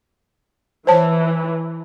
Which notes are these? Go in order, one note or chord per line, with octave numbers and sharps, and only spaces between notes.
E3 C5 C#5 A5